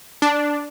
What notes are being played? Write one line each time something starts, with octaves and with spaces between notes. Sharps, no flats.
D4